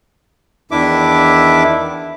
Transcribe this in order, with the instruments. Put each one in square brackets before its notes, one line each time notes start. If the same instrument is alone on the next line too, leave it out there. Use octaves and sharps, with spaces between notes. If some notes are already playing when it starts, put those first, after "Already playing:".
[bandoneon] E2 D#3 D4 E4 E5 D6